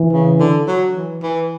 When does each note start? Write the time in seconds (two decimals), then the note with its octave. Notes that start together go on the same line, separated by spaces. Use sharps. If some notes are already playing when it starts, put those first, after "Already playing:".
Already playing: E3
0.13 C#3
0.40 D3
0.68 F#3
0.95 E3
1.22 E3